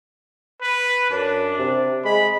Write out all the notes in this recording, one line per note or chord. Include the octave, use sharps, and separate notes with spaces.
B4
F#2 D4
C3
G#3 B5